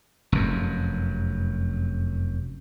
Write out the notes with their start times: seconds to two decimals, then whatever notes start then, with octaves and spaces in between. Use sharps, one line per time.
0.32 F1 F#2